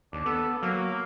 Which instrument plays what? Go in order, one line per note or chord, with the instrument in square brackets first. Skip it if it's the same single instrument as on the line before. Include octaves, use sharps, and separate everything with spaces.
[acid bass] D#2 [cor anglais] D4
[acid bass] B3 [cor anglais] A4
[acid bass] F#3 [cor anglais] A#3